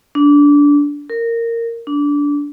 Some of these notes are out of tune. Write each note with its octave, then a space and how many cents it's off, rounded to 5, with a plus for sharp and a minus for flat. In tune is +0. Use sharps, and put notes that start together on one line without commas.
D4 -20
A#4 -15
D4 -20